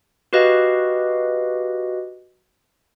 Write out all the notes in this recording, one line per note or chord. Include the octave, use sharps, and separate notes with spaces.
F#4 G4 B4 D#5 F5